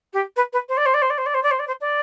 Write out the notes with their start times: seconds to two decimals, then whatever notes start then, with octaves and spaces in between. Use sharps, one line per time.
0.13 G4
0.36 B4
0.52 B4
0.68 C5
0.77 D5
0.85 C5
0.94 D5
1.02 C5
1.10 D5
1.17 C5
1.26 D5
1.34 C5
1.43 D5
1.51 C5
1.59 D5
1.67 C5
1.80 D5